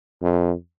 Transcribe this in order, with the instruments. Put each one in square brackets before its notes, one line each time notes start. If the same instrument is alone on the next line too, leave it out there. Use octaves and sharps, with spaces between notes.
[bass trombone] F2